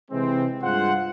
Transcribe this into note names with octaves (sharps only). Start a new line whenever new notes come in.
C3 E3 G#3 C4
G2 G#3 F4 C5 F#5